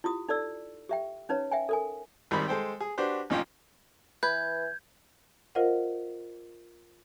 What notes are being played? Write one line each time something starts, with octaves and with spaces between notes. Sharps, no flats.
E4 F4 G4 D#6
D#4 A4 D5 E6
G4 E5 G5
C#4 D#4 B4 C#5
E5 G5 G#5
A4 A#4 G#5
G#1 D#3 G3 C4 B5
G#3 A4 C5 G5
G#4
D4 F#4 G4 B4 C5
A1 F3 C#4 D#4 F4 G5
E3 B4 G6 G#6
F4 A#4 C5 D#5 F5 F#5